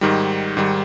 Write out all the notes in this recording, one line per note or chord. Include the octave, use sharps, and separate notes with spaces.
G#2 D#3 G3
G#2 D#3 G3